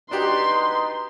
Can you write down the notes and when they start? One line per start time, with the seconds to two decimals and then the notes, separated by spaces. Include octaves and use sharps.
0.11 D4 D#4 F#4 G4 B4 C6